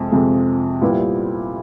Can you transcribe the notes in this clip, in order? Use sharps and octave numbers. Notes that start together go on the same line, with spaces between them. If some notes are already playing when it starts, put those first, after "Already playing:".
Already playing: F2 C3 G#3
F2 C3 F3 G#3
A#2 G3 B3 E4 G4